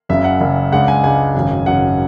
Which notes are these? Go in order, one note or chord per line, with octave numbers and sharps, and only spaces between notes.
F#1 F#2 C#3 E5
F#5
F#1 F#2 C#3
C#2 C#3 G#3 D4 F#5
G#5
C#2 C#3 G#3 D4 G#5
G#1 F#2 C#3
G#1 F#2 C#3 F#5